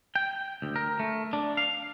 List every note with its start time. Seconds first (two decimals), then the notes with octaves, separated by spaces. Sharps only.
0.16 G5
0.62 D2
0.76 A#4
1.00 A3
1.33 D4
1.57 F5